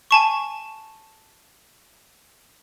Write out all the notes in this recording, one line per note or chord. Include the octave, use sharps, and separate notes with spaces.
G#5 A5 C#6